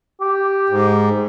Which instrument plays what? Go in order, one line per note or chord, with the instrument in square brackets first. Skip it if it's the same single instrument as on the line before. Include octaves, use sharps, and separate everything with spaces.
[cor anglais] G4
[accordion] G#2